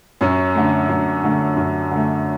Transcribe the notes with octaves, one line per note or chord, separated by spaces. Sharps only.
F#2 C#4
D3 A3
F#2
D3 A3
F#2
D3 A3